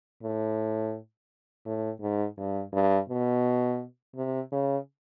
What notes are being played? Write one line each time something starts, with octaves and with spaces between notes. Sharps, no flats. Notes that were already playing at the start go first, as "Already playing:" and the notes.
A2
A2
G#2
G2
G2
B2
C3
C#3